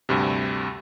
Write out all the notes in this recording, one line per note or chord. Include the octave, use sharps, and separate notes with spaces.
D2 G2 C3